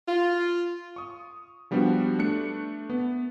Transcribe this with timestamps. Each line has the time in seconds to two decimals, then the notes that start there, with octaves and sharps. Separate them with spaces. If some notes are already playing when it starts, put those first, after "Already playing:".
0.08 F4
0.96 C#6 D#6
1.71 F3 G3 B3 D4 F#4 G4
2.19 A3 D4 F#6 C#7
2.90 B3